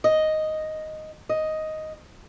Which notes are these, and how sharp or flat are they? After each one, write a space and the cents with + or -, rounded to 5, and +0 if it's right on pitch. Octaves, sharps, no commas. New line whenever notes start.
D#5 +0
D#5 +5